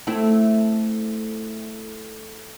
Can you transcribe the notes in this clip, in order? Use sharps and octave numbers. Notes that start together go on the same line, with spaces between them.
A3 C4 E4